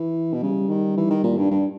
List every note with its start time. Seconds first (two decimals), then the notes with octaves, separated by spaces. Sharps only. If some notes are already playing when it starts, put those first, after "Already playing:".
Already playing: E3
0.33 B2
0.43 C#3 G3
0.69 D#3
0.97 E3
1.10 D#3
1.24 A#2
1.38 G2
1.51 G2